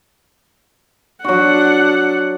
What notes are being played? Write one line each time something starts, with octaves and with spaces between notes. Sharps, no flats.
F#3 D4 F#4 F#5